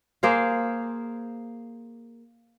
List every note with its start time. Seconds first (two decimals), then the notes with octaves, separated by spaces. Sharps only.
0.23 A#3 G#4 C5 F5